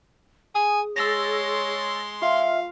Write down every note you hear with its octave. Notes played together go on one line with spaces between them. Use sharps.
G#4 G#5 D#6
G#3 C#5 C6 E6 A6 A#6
F4 E5 F5